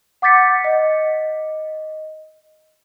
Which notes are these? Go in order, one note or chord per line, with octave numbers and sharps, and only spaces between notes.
F#5 D6 G6 A6 B6 C#7
D#5